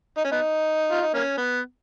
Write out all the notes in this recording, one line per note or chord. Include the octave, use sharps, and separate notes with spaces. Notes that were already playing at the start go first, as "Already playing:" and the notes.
D#4
C#4
B3 D#4
F4
D#4
A#3 C#4
B3